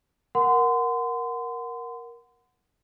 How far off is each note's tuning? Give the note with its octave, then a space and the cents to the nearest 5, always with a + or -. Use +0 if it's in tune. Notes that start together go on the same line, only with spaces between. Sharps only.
A#4 +10 F#5 -5 C6 -35